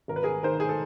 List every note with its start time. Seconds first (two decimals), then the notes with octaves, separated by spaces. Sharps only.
0.08 G#1 A#4
0.16 B4
0.23 G#4 A#4
0.43 D#3 A#4 C5
0.60 G#4
0.69 A4